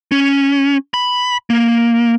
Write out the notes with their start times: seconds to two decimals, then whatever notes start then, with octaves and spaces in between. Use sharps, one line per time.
0.12 C#4
0.94 B5
1.50 A#3